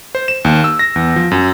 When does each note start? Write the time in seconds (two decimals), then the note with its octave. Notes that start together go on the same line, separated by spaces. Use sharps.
0.15 C5
0.28 E7
0.45 D#2
0.64 E6
0.79 A#6
0.96 E2
1.16 F3
1.31 F#2